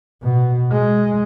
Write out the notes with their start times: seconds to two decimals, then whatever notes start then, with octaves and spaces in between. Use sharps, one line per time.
0.23 B2
0.71 G#3